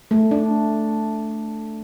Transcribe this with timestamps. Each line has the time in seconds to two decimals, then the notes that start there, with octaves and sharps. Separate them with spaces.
0.11 A3
0.31 D4